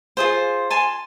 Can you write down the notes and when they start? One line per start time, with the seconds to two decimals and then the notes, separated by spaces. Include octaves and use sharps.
0.17 F4 G#4 C5
0.70 G#5 A5 C6